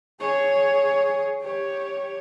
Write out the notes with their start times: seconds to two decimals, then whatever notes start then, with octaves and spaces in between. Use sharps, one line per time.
0.21 G#4 C#5
1.40 G4 C#5